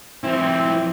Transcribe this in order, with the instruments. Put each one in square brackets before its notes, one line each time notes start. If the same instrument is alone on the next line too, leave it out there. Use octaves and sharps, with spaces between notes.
[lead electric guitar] F3 E4 [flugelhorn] C4